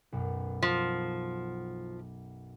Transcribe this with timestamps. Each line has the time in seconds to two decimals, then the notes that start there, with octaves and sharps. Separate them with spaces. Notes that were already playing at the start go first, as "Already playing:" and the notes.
0.12 B1 F#2
0.63 F3